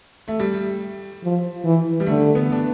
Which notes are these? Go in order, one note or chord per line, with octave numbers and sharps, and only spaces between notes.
A3
G3
F3
E3
G3
D3 A3
B3
D4